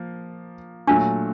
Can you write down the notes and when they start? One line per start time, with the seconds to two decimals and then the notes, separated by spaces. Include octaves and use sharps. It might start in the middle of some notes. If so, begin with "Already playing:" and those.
Already playing: F3 A#3
0.87 A#2 F#3 A3 D4